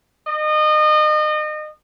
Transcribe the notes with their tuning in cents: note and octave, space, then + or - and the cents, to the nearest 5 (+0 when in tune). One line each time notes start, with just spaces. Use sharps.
D#5 -30